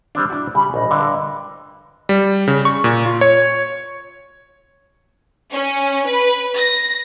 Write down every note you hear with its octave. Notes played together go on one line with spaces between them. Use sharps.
G3 C4 D4
D4 E4 F#4
C#3 G3 B5
A#1 D#5
G2 D3
G3
C#3
C#6
A#2
F4
C#5
C#4
B4
A#6